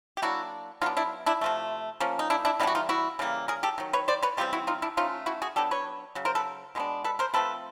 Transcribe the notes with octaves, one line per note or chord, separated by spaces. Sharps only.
G4
F#3 A#3 D4 E4 F#4
F#3 B3 D4 D#4 F4
D4 E4
D4 E4
C3 F3 A3
F3 A#3 C#4
D#4
D4 E4
D4 E4
E3 G3 B3 D4 D#4
F#4
D#4 F4
E4 F#4
C#3 E3 G3 A#3
G#4 A#4
G4 A4
D#3 F#3
B4 C#5
C5 D5
B4 C#5
C#3 E3 G3 C4 F4 G4
E4 F#4
D#4 F4
D4 E4
F3 A3 C#4 D#4 F4
E4 F#4
F#4 G#4
F#3 B3 D4 G4 A4
B4 C#5
C#3 F#3
A#4 C5
A4 B4
B2 G#3 B3 D4
A4 B4
A#4 C5
F3 A3 C4 A4 B4